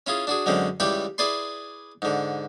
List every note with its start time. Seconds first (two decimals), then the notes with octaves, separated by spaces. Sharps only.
0.07 C#4 E4 F4 G#4
0.27 D4 F#4 G#4
0.46 F#2 D3 G#3 C4 C#4
0.80 C#2 E3 G3 G4 B5 C#6
1.18 E4 G#4 B4 D5 G#5 C6
2.02 G#2 D3